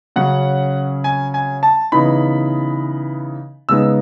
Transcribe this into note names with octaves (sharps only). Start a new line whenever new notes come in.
C#3 F#3 C#4 F#5
G#5
G#5
A5
C#3 E3 B3 D#4 B5
C#3 G#3 B3 D#4 E6